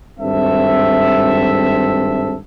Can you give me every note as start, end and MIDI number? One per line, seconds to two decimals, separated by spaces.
0.19 2.37 32
0.19 2.37 43
0.19 2.37 60
0.19 2.37 69
0.19 2.37 76